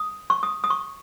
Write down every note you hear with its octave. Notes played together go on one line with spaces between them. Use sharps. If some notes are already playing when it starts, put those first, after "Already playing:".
Already playing: D#6
C#6
D#6
D#6
C#6